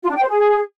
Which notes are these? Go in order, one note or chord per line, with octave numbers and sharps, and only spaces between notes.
F4
D4
G5
C5
G#4